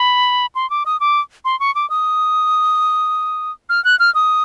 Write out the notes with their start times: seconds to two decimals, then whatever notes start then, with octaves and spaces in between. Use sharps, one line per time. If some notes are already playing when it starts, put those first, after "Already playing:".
Already playing: B5
0.55 C6
0.70 D6
0.86 D#6
1.00 D6
1.45 C6
1.60 C#6
1.75 D6
1.90 D#6
3.69 F6
3.85 F#6
3.99 F6
4.15 D#6